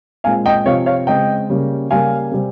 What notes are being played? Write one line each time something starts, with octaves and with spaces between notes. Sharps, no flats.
A#2 G#3 C4 F5 G#5
D#5 G5
C3 F3 C4 C#5 F5
C#5 F5
C#3 G#3 C4 D#5 G5
C#3 G3 A#3
C#3 G3 A#3 F5 G#5
C3 G3 C4